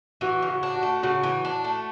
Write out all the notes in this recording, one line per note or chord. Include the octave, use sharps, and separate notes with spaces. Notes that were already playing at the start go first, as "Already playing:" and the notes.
E3 F#4
C#3
F#4
D4
F#4
A3
C#3 F#4
E3
D4
A3